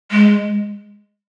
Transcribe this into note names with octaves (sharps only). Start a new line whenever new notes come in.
G#3